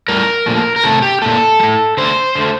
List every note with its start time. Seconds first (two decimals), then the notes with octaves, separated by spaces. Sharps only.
0.08 A2 G3 A#4
0.46 A#2 F3 A3
0.76 A#4
0.84 C3 D#3 A3 A4
1.02 G4
1.22 A#2 A3 A4
1.60 G3
1.63 A2
1.97 D3 A3 C5
2.35 D3 A3